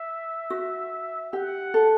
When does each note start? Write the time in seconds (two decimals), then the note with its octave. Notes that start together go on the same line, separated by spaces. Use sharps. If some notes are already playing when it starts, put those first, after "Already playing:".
Already playing: E5
0.50 F#4
1.33 G4 F#5
1.74 A4